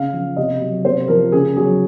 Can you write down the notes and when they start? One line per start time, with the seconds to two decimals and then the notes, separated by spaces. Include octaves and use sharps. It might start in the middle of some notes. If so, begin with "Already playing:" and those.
Already playing: C#3 F5
0.13 F3
0.37 C3 D#5
0.61 F#3
0.85 C3 C5
1.08 F3 A#4
1.32 C#3 G#4
1.57 F#3 G#4